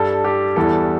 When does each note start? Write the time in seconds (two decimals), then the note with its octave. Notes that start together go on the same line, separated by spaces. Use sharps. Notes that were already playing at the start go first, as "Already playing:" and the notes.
Already playing: G2 G3 A4
0.24 G4
0.56 E2 E3 G3 A4